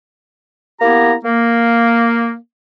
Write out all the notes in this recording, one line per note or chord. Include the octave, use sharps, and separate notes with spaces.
A#3 B3 E4 G4 A#5
A#3